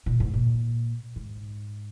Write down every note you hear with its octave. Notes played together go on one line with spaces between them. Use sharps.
A#2
G#2
A#2
G#2